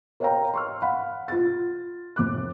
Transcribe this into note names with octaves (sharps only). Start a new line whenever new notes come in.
A#4 C#5 D#5 F5 G5 A#5
C6 C#6 F6
F5 F#5 B5
F4 A6
F1 D6 F#6